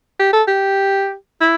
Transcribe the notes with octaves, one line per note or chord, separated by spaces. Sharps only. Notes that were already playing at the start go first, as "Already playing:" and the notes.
G4
A4
G4
E4